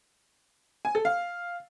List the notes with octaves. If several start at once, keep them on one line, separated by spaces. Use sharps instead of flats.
G#5
A4
F5